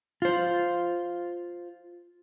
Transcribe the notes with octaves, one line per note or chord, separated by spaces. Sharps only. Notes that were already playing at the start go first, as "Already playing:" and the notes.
F4 C5